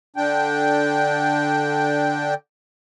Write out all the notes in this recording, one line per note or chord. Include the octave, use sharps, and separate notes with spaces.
D3 D4 G5